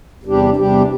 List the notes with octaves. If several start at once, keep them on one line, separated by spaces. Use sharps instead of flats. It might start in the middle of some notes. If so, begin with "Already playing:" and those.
E2 C3 G3 D4 G4
E2 C3 G3 D4 G4